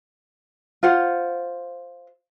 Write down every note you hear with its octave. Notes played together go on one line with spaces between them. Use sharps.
F4 C5 F#5